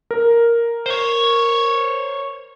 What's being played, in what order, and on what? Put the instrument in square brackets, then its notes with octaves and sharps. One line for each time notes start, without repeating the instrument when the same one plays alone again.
[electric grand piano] A#4
[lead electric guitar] C5 C#5